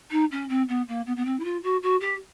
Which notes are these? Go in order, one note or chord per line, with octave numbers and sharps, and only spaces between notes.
D#4
C#4
C4
B3
A#3
B3
B3
C4
E4
F4
F#4
F#4
G4